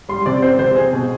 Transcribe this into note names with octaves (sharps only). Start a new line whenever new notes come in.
G3 C6
C3 D5
C4 C5
C3 C5
C4 G#4
B2